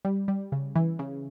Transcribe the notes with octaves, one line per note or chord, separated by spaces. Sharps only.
G3
G3
C#3
E3
C#3